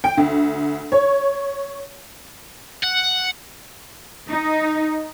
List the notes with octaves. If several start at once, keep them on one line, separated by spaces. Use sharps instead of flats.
G5
D2
C#5
F#5
D#4